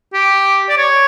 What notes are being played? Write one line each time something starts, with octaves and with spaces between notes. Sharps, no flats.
G4
D5
C#5